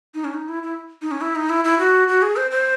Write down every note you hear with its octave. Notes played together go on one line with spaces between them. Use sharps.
D#4
C#4
D#4
E4
E4
D#4
C#4
E4
D#4
E4
E4
F#4
F#4
G#4
C5
C5